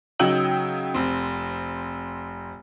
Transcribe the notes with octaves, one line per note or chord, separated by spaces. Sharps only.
C#3 F#3 D#4 G5 E6 F#7
F1 C4